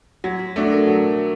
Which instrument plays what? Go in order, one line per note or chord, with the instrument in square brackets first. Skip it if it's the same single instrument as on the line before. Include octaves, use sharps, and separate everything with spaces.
[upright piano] F#3 [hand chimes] F#4
[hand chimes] F#4
[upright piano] A3 D4 F#4 [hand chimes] A4
[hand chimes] A#4
[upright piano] F#3